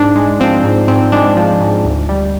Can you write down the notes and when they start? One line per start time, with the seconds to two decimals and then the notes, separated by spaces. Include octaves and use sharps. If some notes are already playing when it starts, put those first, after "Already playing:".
Already playing: G#2 D4
0.16 G#3
0.40 F3 C4
0.64 G#2
0.88 G#2 C4
1.12 G#3 D4
1.37 F3
1.61 G#2
1.85 D2
2.09 G3